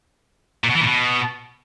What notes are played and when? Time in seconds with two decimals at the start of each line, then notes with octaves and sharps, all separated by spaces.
0.64 A#2
0.70 B2
0.75 E3
0.81 A#2
0.87 B2